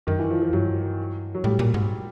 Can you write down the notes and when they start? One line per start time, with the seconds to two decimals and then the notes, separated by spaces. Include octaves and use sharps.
0.07 F#2 D#3
0.19 E3
0.30 F3
0.42 F3
0.53 G2 F#3
1.34 F#3
1.44 A2 G3
1.59 A#2
1.74 G#2